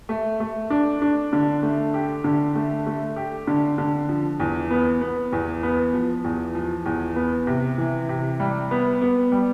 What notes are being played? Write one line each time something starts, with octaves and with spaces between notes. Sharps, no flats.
A3
A3
D4
D4
D3
A3
G4
D3
A3
A3
G4
D3
D3
F3
E2
B3
B3
E2
B3
F3
E2
F3
E2
B3
C3
E3
C3
G3
B3
B3
G3